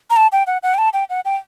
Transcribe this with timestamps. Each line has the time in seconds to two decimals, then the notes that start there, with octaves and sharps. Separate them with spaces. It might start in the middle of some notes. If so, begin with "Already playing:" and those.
0.10 A#5
0.16 A5
0.32 G5
0.47 F#5
0.63 F#5
0.74 G5
0.78 A5
0.93 G5
1.10 F#5
1.25 G5